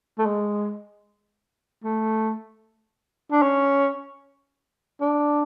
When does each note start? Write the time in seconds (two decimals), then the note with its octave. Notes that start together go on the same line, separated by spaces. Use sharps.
0.18 A3
0.25 G#3
1.84 A3
3.31 D4
3.42 C#4
5.00 D4